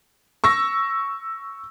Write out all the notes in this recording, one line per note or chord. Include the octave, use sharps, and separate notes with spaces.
C#6 E6 A#6